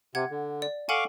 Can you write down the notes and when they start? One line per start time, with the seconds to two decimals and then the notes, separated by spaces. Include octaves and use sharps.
0.15 C3 F#5 G#6
0.31 D3
0.62 D5
0.89 A4 F5 F#5 G#5 C#6 D6